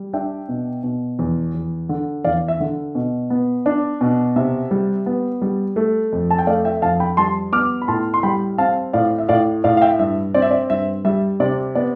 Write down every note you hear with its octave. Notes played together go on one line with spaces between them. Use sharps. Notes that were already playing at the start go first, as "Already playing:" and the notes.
Already playing: G3
D4 E5 G5
B2
B2
E2
E2
D3
E2 D5 F5
E5
D3
B2
B3
D4
B2
C3 E5
G3
B3
G3
A3
F2
A5
G5
A3 D5 F5
E5 G5
F2 F5 A5
G5 B5
G3 A5 C6
B3 D6 F6
B5
A2 A5 C6
C6
G3 G5 B5
C4 F5 A5
A2 D5 F5
E5
A2 D5 F5
A2 D5 F5
F5
E5 G5
G2 E5
C4 D5
E5
D5
G2 E5
G3 E5
C3 D5
B3 D5